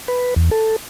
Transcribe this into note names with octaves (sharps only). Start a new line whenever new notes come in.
B4
E2
A4